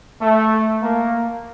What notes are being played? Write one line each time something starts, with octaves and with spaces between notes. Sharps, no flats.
A3
A#3